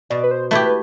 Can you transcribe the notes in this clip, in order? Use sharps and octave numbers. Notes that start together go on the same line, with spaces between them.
B2 D5
B4
C5
A3 E4 G4 B4
B4